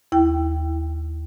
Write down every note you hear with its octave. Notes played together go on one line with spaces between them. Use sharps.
D#2 E4 G5